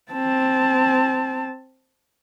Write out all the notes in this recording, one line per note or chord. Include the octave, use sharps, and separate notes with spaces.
C4 A5